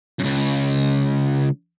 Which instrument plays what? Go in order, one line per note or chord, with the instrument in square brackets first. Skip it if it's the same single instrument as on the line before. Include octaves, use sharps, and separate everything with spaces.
[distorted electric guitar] C#2 F#2